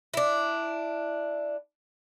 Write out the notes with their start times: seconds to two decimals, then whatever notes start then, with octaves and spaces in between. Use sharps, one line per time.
0.14 D4 E4